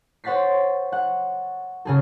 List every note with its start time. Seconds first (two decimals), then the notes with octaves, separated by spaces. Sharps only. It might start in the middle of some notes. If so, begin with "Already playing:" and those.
0.24 C5 C#5 F#5 A6 B6 C7
0.92 F#5
1.85 C#3 G#4 A4